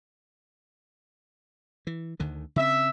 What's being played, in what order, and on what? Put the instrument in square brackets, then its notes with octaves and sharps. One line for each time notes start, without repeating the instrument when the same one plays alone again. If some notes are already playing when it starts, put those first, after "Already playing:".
[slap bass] E3
D2 D3 D#3
[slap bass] C#3 C4 [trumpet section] E5